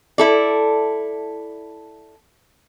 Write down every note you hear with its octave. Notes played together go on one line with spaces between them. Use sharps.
E4 A4 D5